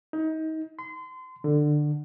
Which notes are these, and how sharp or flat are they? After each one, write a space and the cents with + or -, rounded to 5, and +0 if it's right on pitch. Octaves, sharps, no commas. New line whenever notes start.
D#4 +30
C6 -30
D3 +15